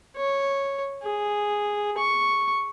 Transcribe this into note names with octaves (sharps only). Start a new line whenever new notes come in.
C#5
G#4
C#6